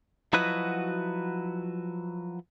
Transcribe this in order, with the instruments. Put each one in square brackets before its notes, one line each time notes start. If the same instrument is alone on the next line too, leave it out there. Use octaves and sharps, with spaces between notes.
[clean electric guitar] F3 F#3 E4 F#4 B4 D#5